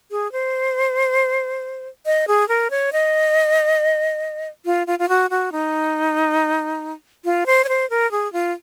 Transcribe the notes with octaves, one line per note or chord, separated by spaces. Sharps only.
G#4
C5
D#5
G#4
A#4
C#5
D#5
F4
F4
F4
F#4
F#4
D#4
F4
C5
C#5
C5
A#4
G#4
F4